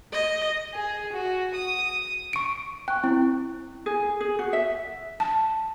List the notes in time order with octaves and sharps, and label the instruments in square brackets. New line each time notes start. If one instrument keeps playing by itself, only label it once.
[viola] D#5
[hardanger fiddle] G#4
F#4
D#6
[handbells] C#6 D7
[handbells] G5 [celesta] C#6 F#6
[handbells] C4 [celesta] E4
[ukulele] G#4
G#4
F#4
E5
[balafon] A5